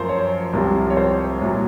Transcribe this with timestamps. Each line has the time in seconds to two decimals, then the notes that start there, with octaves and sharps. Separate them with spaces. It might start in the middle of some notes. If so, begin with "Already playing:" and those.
Already playing: F#2 F3 A#4 C5
0.09 C#5
0.53 C2 C3 F3
0.90 C#5
0.97 C5
1.41 C2 A#2 F#3